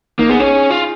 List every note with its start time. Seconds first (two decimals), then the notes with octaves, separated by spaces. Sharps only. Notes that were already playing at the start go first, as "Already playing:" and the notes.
0.18 A#3 D#4
0.29 B3 G#4
0.39 C#4 G#4
0.70 F4